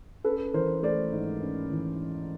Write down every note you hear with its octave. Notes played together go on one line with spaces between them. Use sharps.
C#4 A4 B4
E3 A#4 C5
A3 C5 D5
G#2
C#4
E3